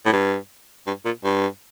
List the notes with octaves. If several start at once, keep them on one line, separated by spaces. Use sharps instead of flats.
A2
G2
G2
A#2
G2